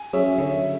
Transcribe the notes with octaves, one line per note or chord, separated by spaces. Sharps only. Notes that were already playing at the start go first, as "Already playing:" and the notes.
Already playing: G#5
F#3 C#4 G#4 E5
D3 E5